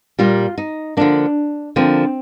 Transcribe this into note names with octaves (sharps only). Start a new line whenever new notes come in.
A#2 G3 A#3 F4
D#4
D3 F3 A#3 D4
D3 F3 A#3 C4